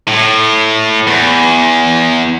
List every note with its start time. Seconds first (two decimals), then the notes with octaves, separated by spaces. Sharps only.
0.08 A2
1.07 E2